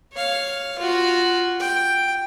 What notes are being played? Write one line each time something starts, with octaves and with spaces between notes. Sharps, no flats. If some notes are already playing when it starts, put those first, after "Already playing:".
C#5 F5
F4 F#4
G5